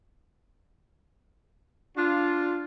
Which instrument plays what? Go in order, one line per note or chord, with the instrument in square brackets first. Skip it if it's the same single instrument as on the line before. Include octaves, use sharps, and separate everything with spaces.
[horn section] D4 F4